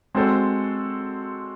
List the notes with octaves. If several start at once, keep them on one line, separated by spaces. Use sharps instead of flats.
G#3 C4 F#4 A4 C5